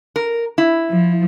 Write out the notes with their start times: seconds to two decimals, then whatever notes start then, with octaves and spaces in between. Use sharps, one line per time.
0.16 A#4
0.58 E4
0.90 F3